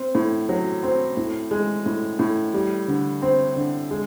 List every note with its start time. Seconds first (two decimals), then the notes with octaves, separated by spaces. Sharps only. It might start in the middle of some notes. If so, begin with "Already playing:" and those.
Already playing: C4
0.15 A2
0.49 F#3
0.83 C4
1.17 A2
1.51 G#3
1.86 A2
2.19 A2
2.54 G3
2.88 D3
3.22 C4
3.56 D3
3.91 G#3